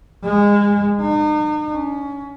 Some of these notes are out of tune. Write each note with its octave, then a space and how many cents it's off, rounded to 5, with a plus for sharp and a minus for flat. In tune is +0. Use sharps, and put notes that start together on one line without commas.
G#3 -25
D#4 -40
C#4 +25